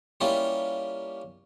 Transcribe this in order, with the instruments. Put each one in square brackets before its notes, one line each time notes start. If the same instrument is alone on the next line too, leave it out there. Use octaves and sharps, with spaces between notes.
[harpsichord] G3 A#3 C#4 E4 F4 G4